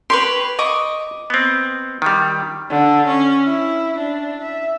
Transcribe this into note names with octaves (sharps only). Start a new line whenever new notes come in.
G4 B4 C#5 C6
D#5 C#6 D6
B3 C4
D#3 G3
D3
C#4
E4
D4
E5